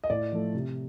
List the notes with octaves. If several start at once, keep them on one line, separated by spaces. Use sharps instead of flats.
D#5
A2 D5
F3 A3
C3